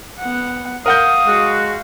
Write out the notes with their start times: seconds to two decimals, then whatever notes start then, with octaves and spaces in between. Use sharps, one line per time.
0.19 B3 F#5
0.86 A#4 F5 F#5 D#6 G6
1.27 G#3 F#4